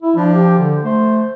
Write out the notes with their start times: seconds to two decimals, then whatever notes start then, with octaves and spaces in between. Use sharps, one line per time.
0.02 E4
0.16 F3 D4
0.33 G4
0.58 D3
0.84 A3 C5